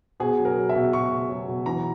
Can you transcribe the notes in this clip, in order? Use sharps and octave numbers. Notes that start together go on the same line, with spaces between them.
B2 G#4
F#3
A#4
F#3
E5
B2
B2 C#6
B2
F#3
B2
E3 A#5